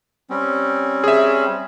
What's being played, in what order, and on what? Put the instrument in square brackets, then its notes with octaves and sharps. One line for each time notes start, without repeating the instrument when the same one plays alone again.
[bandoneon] G3 C4 C#4
[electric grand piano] G#4 E5